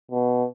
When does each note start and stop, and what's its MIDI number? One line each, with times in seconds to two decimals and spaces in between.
0.12 0.45 47